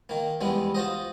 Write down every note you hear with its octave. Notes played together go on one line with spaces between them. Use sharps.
D#3 A#3
E2 G3 G#3 B3
F4 F#4 C5 D#5